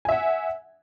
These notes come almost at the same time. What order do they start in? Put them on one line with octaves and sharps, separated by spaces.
G#5 E5 F#5